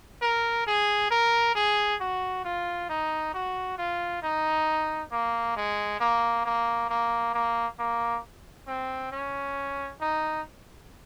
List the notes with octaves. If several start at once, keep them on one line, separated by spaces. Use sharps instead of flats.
A#4
G#4
A#4
G#4
F#4
F4
D#4
F#4
F4
D#4
A#3
G#3
A#3
A#3
A#3
A#3
A#3
C4
C#4
D#4